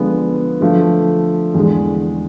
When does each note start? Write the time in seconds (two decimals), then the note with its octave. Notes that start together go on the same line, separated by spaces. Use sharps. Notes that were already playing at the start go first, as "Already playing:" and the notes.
Already playing: D3 F3 G#3 B3
0.61 D3 F3 A3
1.54 E2 D3 G#3